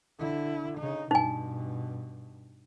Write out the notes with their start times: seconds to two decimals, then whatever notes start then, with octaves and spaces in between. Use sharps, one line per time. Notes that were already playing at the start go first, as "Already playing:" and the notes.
0.19 D3 E4
0.78 C#3 D#4
1.11 G2 B2 D#4 G#5